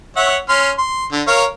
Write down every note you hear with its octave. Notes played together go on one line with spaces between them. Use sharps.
C#5 E5 F#5
C#4 C6 F6
C6
D3
A#4 C#5 F5